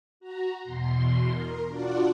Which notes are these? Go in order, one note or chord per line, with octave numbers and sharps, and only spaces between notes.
F#4 A#5
E2 B2 C6
A#4
D4 F4 F#4 D5 F#5